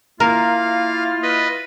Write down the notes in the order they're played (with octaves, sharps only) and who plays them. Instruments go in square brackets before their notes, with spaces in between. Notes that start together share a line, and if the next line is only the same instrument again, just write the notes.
[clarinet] A#3 [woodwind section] E4 F4 [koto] A#4 [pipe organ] F5
[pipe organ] B4 D#5